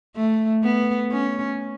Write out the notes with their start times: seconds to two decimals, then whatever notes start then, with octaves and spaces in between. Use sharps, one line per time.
0.16 A3
0.63 B3
1.11 C#4